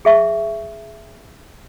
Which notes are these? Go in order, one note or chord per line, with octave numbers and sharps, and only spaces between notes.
G#4 E5 C#6